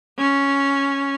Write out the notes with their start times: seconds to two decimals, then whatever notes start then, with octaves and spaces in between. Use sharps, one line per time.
0.18 C#4